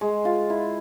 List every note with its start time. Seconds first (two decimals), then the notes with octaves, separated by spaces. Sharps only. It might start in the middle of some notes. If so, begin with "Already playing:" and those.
0.01 G#3
0.25 F4
0.50 E4